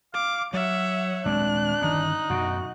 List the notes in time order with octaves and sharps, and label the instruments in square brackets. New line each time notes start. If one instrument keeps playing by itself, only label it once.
[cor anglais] F5 [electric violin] D6
[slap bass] F#3 [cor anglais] C#5 [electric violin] E5 F#5
[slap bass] D#1 G#3 C4 [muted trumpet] D4 [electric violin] F#6
[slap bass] G1 D#3 C#4 [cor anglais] D#4
[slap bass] F#2 B2 [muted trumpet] F#4